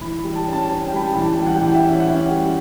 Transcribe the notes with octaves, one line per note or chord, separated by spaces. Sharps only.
E3 B5
B5
G3
A5
C#4
A5
C#4
G5
G3 B5
A5
E3 G5
A5
G3 G5
F#5
G5
E3
E5
C#4
F#5
C#4 E5
G3